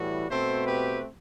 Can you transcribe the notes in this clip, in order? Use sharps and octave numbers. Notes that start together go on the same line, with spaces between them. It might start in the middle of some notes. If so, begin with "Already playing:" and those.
Already playing: A2 E3 G3 F#4
B2 A3 C4 A4 C5
G4 B4